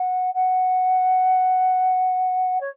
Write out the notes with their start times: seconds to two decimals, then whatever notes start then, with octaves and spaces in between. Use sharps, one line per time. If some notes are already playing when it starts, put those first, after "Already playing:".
Already playing: F#5
0.34 F#5
2.61 C#5